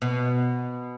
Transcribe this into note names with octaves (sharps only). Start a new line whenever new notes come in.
B2